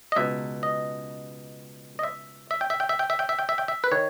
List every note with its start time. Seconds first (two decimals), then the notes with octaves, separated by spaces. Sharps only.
0.12 D#5
0.16 C#2 B2 E5
0.63 D#5
1.99 D#5
2.03 E5
2.51 E5
2.61 G5
2.70 E5
2.80 G5
2.89 E5
2.99 G5
3.10 E5
3.19 G5
3.29 E5
3.39 G5
3.49 E5
3.58 G5
3.68 E5
3.84 B4
3.91 D#3 C#5